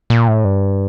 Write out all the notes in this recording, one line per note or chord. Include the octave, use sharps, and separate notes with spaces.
A#2
A2
G2